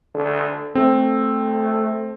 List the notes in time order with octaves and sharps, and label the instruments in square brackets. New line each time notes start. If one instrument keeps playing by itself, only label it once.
[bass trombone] D3
[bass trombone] A3 [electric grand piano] C4